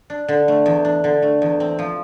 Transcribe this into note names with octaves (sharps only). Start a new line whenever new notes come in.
D4
D3
A3
E2
D4
D3
A3
E2
C4
F3